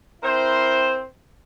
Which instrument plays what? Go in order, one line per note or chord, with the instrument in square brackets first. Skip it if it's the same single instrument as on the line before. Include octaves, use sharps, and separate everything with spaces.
[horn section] C4 E4 A#4 C5